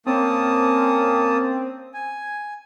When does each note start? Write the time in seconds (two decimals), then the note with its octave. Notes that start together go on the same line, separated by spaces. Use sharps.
0.06 A#3 C4 C#4 A5 D#6
1.94 G#5